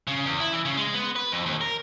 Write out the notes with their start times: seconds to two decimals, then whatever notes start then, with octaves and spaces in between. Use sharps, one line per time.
0.07 C#3
0.25 E2
0.40 E4
0.53 E3
0.65 C#3
0.77 G#3
0.94 B3
1.16 B4
1.32 F2
1.46 D#2
1.61 A#4